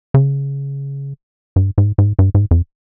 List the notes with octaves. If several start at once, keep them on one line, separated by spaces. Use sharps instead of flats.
C#3
G2
G#2
G#2
G2
G#2
F2